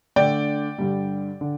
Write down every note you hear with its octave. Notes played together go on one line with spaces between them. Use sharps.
D3 A3 D4 D5 G5
G2 D3 G3
D3